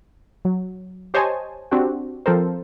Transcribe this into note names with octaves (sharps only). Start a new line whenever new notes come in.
F#3
G4 C5 C#5 D#5 G#5 A5
C4 D4 F#4 G4
F3 C4 A4 A#4 C5